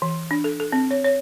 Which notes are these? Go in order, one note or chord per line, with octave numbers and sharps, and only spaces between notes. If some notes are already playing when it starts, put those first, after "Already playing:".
E3
D4
A4
A4
C4
C#5
C#5